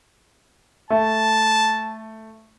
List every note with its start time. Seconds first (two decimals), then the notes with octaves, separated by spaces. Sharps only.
0.90 A3 A5